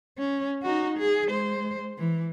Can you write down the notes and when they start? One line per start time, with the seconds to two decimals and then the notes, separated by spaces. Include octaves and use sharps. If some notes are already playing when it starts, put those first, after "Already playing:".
0.18 C#4
0.62 D#4 F#4
0.98 G#4
1.27 G#3 C5
1.98 E3